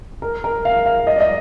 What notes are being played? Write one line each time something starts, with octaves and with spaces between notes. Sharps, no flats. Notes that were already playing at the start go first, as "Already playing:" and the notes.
A#4
A#4
F5
F5
D#5
D5
D#5